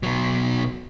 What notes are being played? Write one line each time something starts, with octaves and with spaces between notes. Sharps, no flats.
B2 F#3